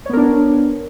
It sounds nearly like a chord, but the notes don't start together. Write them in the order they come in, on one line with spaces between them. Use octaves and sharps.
C#5 B3 A#4 D4